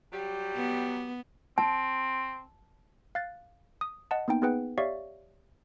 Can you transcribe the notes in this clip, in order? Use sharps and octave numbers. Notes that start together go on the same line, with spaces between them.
F#3 G3 G4
B3
C4 A5
F5 F#6 A6
D#6
D#5 F#5 A5
A#3 B3 D#4 G5
B3 D#4 G#4 B4 F#5 G5
G4 C#5 D5 E5 F5 C#6